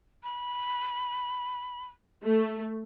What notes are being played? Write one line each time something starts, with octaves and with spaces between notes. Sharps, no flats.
B5
A3